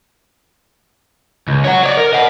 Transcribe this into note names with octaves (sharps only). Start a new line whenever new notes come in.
C#2
C#5 F#5
C#5 D5
A#4
D#5 F#5